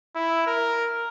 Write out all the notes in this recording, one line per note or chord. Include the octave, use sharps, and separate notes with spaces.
E4
A#4